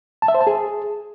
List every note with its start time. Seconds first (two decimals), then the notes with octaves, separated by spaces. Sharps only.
0.22 A5
0.28 E5
0.35 C5
0.41 A5
0.47 G#4